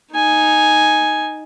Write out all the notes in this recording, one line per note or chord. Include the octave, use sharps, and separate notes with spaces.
D#4 G#5